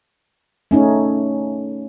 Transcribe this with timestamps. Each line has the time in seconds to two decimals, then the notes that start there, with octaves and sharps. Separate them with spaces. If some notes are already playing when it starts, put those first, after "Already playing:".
0.71 A3 C#4 D#4